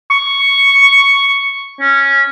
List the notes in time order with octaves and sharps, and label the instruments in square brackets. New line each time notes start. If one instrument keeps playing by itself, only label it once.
[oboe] C#6
C#4